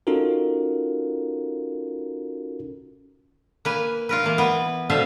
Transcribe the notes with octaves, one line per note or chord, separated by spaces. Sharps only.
C#4 D#4 F4 F#4 A4 A#4
A#3 B4 G#5
F4 A#4 B4
E3 A#3
B3 B4
B2 D3 C5 E5 F5